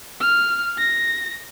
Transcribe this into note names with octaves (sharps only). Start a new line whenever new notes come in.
F6
A#6